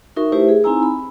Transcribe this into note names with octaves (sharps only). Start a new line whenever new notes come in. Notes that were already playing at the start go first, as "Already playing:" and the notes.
D#4 F#4 A#4 E5 C#6
A3 E4 G4 B4 C5 E5
G#4
C4 D#4 E4 G#5 A#5 E6
B5